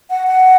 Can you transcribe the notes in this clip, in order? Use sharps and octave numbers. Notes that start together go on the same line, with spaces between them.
F#5
F#5